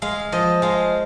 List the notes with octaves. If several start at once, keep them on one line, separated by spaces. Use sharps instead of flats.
G#3 F5
F3 D#5
G#3 F5